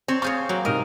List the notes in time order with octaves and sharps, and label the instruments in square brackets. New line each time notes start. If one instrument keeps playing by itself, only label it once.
[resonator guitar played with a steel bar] C4 [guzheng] C#5
[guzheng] F4 G#4 C#5 [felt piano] C#6 G6
[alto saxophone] F#3 [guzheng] A#3
[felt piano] G#2 C3 [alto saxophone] A#4 [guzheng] D#5